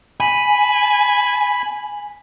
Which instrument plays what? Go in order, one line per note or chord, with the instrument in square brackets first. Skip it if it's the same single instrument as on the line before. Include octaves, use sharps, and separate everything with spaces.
[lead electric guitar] G#5 [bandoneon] B5